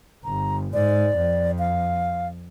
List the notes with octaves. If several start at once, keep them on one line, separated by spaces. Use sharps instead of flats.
G1 A#5
G#2 D5
F2
F5